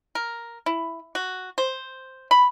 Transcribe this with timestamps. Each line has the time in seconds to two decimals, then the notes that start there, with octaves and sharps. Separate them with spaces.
0.15 A#4
0.66 E4
1.15 F#4
1.58 C5
2.31 B5